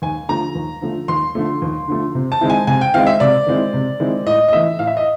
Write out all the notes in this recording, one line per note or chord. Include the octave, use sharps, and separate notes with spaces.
D#2 G#5
D3 F3 A3 A#5
D#2
D3 F3 A3
D#2 C6
D3 F3 A3
D#2
D3 F3 A3
C3
A5
D#3 G#3 C4 E4
G#5
C3 G#5
G5
D#3 G#3 C4 E4 F5
E5
C3 D5
D#3 G#3 C4 E4
C3
D#3 G#3 C4 E4
A2 D#5
D#5
E3 A3 E5
A2 F5
E5
D#5